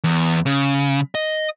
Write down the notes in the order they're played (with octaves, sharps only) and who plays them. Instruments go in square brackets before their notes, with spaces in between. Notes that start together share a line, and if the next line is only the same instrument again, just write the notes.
[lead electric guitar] E2
C#3
D#5